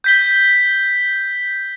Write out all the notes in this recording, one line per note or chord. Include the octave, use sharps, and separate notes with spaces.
G6 B6 G7